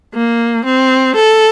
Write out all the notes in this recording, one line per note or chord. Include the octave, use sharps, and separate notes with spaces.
A#3
C4
A4